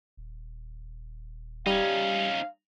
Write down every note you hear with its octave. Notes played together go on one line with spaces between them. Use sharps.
D#1
G3 C#4 D#4 F5